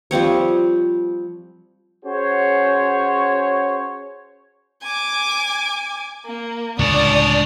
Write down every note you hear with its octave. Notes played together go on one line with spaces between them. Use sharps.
F3 G3 C4 C#5
C#4 F#4 G#4 C5 C#5
G#5 D6
A#3
C#2 A2 D3 D4 C#5 D5 D#6